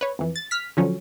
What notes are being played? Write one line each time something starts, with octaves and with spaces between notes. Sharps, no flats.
B4 C#5
F2 E3
A6
F6 B6
D3 F3 F#3 C#4